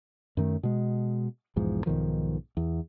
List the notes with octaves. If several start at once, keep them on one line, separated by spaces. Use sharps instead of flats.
F#2 D#3 A3
B2 G#3
B1 E2 G#2 F3
B1 G#2 D#3 F3
E2